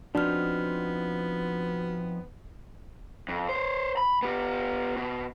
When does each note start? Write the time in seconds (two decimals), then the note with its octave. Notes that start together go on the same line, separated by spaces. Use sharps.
0.15 F3 B3 C4 D4 D#4 F#4 F6
3.29 F2
3.49 C5 C#5
3.97 B5
4.23 B3 G4
4.96 B2